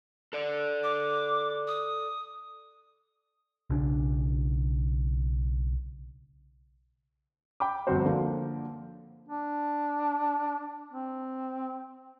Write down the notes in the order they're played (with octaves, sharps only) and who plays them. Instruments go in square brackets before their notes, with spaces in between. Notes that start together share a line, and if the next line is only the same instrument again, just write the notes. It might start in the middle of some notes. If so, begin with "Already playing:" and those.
[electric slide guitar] A4 D5
[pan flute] D6
D#6
[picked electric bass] B1 C#3 D4
[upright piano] G5 B5 D6
G1 D2 F3 C4 F#4 C5
D3 F3 A#3
[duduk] D4
C4